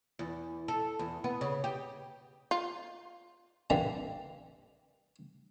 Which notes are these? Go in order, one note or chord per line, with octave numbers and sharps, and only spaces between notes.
E2
A4
E2
B3
C#3
G4
F4
A#2 D3 E3 G3 C4